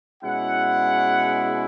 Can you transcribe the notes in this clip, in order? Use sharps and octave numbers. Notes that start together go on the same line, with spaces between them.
B2 G#3 C#4 E4 F#5